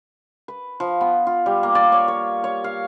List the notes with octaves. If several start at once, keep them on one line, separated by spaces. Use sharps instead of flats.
B4
F3
B3
F4
G3
A#3
D5
C#5
C#5
C#5
F5